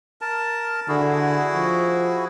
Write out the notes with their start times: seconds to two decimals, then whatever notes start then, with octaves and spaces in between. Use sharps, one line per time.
0.21 A#4 A5
0.88 D3 E4 F#4 G#4
1.55 F3